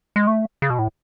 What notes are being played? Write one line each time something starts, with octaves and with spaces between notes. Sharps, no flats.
G#3
A3
C#3
B2
A2